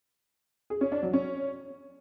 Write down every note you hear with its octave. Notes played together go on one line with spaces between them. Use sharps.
G#4
C#4
D4
F#3
C#4